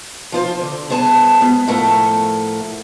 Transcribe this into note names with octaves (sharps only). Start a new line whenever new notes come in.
F3 F4 C5
D3
G2 B3 G#4 C5 A5
G#3 B3
A2 F3 A3 A4 A#4 F#5